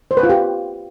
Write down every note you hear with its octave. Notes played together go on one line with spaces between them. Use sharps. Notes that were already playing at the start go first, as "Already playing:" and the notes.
C5
B4
F4
G4